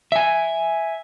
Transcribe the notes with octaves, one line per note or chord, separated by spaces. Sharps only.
E5 G#5